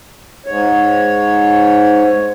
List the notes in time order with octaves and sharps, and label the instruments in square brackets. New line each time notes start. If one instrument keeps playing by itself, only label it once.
[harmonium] G#2 C#5